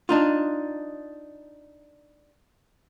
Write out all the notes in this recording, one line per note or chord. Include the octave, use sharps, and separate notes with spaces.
D4 D#4 F4